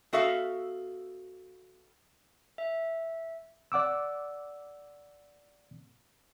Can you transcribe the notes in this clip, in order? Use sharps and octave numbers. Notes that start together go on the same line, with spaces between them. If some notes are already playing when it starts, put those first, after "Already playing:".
B3 F#4 A4 E5 F5
E5
D5 F#5 D6 E6